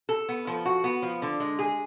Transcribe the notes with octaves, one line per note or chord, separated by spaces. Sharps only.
A4
B3
F3
F#4
B3
F3
D3
G#3
G#4